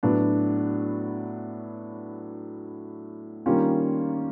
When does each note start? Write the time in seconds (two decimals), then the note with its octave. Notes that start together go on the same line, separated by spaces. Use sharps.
0.03 A2 F#3 B3 D4
3.46 D#3 G3 A#3 C#4 F4